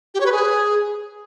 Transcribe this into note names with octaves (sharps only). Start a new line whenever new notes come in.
G4
C#5
B4
G#4